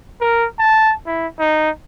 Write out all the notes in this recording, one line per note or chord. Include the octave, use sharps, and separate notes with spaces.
A#4
A5
E4
D#4